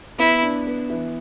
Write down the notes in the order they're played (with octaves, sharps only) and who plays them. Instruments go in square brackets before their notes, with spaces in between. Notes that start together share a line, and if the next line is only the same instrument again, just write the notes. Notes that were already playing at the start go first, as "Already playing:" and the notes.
[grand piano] B3 [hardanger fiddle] E4
[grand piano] D4
B3
E3